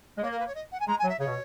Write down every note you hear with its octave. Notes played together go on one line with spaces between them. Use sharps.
G#3
A#3 C#5
A#4
B4
C#5
D#5
F#5
G#5
G#3 A#5
G#5
F#3
E5
C#3 C#5
B2